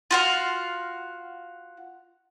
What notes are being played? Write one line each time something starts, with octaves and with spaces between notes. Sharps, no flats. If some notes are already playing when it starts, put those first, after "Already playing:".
F4 F#4 F5